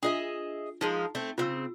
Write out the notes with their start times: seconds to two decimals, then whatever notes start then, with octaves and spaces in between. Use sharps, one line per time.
0.03 D4 F4 G#4 D#5 E5
0.81 F3 G#3 D#4 A#4
1.15 A3 C4
1.38 C#3 C4 F4 E6